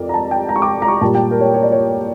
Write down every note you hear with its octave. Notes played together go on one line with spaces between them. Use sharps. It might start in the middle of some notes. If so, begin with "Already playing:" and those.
Already playing: F2 A#4 D5
A#5
A5
G5
A#5
C#6
D6
A#5
C#6
A#2 G3 A5
G5
A#4
C#5
C#5
D5
C#5